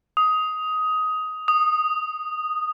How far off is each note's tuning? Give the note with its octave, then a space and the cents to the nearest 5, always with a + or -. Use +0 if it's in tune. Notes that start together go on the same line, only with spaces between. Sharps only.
D#6 +15
D#6 -10